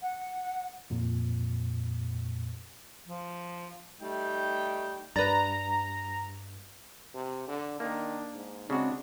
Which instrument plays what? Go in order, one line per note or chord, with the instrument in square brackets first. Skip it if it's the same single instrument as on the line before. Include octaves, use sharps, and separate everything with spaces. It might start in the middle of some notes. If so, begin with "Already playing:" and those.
[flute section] F#5
[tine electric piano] F2 A#2
[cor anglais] F3
[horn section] G3 D#4 G5 [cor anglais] A3
[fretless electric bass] G2 [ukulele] B4 D5 [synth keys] A#5
[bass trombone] C3
D3
[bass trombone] D#3 [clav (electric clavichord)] A#3 [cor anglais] D4
[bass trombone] G#2
[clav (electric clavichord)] C#3 F#4 [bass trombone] G#3 [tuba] C4 [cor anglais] D4